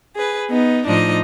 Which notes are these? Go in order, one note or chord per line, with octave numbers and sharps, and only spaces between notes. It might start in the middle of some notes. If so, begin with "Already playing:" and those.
G#4 B4
B3 D#4
A2 F3 D4 D#4 D#5